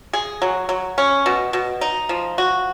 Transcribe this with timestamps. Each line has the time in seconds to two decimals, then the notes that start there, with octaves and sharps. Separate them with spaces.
0.13 G#4
0.42 F#3
0.69 F#3
0.98 C#4
1.26 B2
1.53 B2
1.81 D#4
2.09 F3
2.38 F#4